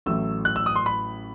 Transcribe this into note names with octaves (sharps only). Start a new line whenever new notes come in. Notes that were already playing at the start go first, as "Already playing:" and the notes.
A1 A2 F#3 A3 E6
F#6
E6
D#6
C6
B5